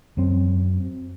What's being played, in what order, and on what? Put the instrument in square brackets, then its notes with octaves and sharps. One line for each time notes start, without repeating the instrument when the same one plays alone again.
[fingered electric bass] F#2 F#3 C4